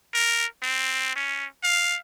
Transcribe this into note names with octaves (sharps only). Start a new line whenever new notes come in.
A#4
C4
C#4
F5